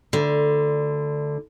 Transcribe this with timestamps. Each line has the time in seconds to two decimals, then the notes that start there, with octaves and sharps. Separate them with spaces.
0.13 D2 D3